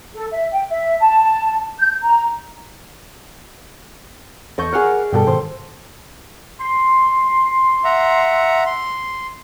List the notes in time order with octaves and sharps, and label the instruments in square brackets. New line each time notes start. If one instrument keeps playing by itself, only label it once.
[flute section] A4
E5
G5
E5
A5
G6
A#5
[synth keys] E2 A4 G6 [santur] D#5 C#6
[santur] G#4 D5 [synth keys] A#4 F#5 F6
[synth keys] G2 B2 G3 [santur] A4 G5
[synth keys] G#2 B2 D#3 [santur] C5
[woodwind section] C6
[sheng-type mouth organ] E5 F#5 A#5
C6